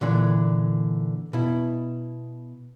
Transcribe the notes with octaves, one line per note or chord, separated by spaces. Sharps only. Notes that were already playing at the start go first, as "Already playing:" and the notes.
A#2 D3 E3 D4
B2 E4